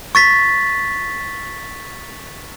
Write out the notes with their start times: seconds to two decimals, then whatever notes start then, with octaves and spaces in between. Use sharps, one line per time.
0.15 C#6 A6 B6